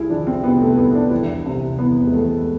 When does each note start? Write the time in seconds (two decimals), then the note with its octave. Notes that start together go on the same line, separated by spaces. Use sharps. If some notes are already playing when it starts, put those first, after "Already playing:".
Already playing: C2 E4 G#4
0.09 F3 D4
0.27 C4
0.43 C3 B3
0.61 A3
0.77 C2 B3
0.95 D4
1.11 E2 E4
1.46 C3
1.78 E2 B3
2.07 G#3
2.13 E2 A3